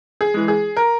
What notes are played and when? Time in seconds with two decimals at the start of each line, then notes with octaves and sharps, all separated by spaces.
0.21 G#4
0.34 E3 G#3
0.48 G#4
0.77 A#4